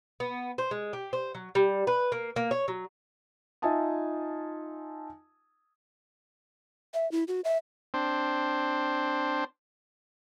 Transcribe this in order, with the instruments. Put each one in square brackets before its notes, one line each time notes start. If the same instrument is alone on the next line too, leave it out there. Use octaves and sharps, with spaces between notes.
[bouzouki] B3
C5
G#3
G4
C5
F#3
G3
B4
A#3
A#3
C#5
F#3
[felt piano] D#4 F4 E5 G#5 A5 D#6
[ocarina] E5
E4
F#4
E5
[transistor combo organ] C4 D4 C5